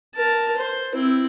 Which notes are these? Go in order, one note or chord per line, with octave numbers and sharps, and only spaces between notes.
A#4 A5
C5
C4 E4